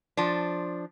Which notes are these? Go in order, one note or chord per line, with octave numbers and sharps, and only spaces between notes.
F3 D4